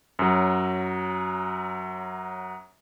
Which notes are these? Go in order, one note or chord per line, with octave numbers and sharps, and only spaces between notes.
F#2 F#3